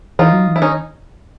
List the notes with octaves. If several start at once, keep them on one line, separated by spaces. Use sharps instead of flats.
E3 D#4 F4
F#3
E3
E4
D#3 C#4 D#4